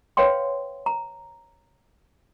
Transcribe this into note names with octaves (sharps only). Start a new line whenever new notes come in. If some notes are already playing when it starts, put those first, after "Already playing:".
B4 C#5 F5 G5 C6
A#5